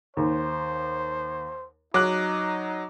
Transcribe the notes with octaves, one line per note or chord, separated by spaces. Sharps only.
D#2 C5
F#3 D#4 D6 F#6